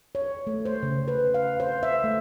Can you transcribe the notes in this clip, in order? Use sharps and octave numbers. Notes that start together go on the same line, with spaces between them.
C#5
A3
C5
C#3
B4
F5
C5
E5
A3